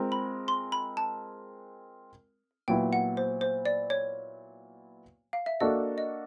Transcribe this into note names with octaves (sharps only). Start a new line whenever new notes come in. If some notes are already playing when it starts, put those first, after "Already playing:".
Already playing: G#3 C4 F4 A#4
B5
C6
B5
A5
A#2 F#3 B3 E4 G5
F#5
C5
C5
D5
C#5
F5
E5
A#3 D4 F#4 A4 D#5
D#5